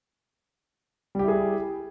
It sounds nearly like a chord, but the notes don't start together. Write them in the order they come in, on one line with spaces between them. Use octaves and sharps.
G3 G4 E4 G#4